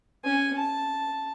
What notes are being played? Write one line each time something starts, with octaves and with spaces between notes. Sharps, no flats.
C#4 G#5
A5